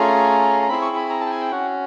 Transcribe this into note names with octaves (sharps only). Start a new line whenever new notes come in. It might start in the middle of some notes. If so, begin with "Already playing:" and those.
Already playing: A3 C#4 F4 G#4 A#5
A#5
C4 E4 G#4 B5
C#6
B5
A#5
A5
G5
G#5
G5
C#4 F#4 F#5